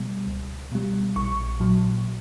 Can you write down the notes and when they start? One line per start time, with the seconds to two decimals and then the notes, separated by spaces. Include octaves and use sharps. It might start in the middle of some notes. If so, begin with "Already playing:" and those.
Already playing: B2 G3
0.27 C#2
0.72 B2 G3
1.16 A#1 C#6
1.60 A#2 F#3